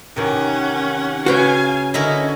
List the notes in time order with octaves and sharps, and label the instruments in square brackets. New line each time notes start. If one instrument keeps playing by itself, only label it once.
[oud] C3 D#3 E3 [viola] C#4 F#5
[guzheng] C#3 G5 [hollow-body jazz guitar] F#4 B4 C#5 [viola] F5 G#5
[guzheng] D3 E4 A#4 [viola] C#4 [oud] D#5